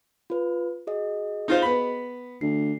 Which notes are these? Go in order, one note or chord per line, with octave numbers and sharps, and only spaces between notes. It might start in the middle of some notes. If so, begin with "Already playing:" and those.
F4 B4
F#4 G#4 D#5
D#4 F4 C5
B3 B5
D2 C7